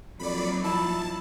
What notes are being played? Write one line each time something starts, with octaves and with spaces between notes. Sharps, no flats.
F2 F#3 A#3 D#4 D5 B5
F3 E4 A5